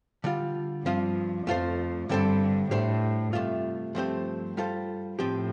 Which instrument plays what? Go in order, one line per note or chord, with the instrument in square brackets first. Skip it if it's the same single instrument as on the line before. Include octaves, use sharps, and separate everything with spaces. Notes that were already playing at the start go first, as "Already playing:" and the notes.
[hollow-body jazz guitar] D3 G3 F4
[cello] G2 [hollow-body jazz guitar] F3 C4 F4
[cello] F2 [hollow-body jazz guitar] A3 F4 A4 C5
[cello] G2 [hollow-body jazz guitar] D3 G3 C4 A4 C5
[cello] A2 [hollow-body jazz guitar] A3 D4 G4 C5
[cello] G2 [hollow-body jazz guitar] C3 A3 F4
[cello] G2 [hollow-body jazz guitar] F3 A3 C4 G4 C5
[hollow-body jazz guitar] G3 F4 A4 C5
[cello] A2 [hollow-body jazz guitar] F3 C4 G4